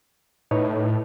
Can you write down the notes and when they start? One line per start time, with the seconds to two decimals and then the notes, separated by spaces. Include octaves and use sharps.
0.51 A2 D#4 B4 C#5